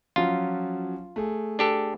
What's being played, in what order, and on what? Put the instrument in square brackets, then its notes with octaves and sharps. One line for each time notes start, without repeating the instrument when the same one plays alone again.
[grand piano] F3 F#3 C#4 [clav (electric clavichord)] F4
[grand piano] A3 G#4
[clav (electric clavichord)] D4 G4 A4